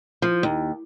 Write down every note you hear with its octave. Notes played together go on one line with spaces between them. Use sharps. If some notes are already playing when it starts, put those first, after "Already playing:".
F3
D#2